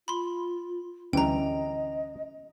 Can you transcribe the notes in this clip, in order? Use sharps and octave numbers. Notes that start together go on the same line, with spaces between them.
F4 B5 C6
D2 E3 G3 C#4 D#5 G5 A#5